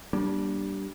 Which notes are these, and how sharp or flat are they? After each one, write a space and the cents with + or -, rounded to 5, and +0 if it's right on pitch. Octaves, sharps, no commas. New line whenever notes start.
G3 -15 A#3 +35 D4 +0